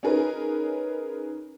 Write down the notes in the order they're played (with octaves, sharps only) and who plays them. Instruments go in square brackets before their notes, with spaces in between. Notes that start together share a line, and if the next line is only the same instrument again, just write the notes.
[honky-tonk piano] C#4 D#4 G#4 A#4 B4